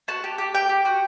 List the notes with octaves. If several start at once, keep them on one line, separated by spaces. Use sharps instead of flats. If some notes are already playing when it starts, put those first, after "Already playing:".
F#4 A5
G4
G4
G4 G5
G4
F#4